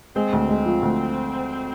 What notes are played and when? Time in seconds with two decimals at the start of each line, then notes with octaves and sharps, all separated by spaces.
0.16 G#3 C4
0.33 D2
0.49 G#3
0.66 F3
0.83 D2